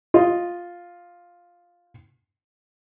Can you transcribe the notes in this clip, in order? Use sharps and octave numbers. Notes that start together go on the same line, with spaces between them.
F4 D#5